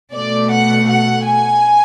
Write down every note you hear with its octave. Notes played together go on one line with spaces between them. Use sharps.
B2 A3 D5
F#5
F#5
G#5